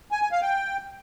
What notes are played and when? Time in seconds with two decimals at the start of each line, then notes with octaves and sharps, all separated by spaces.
0.12 G#5
0.22 G#5
0.32 F5
0.42 G5